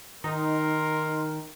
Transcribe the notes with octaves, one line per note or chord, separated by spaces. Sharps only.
D#3 D#4 A#4 C6